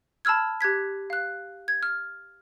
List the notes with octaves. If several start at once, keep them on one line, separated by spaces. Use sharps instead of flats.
A5 B5 E6 F6 G#6
G4 F#6 G#6 B6
F5 F#6
G#6
F6